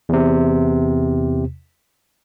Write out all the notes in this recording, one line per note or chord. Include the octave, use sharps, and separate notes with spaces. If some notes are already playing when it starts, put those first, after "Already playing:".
E2 C3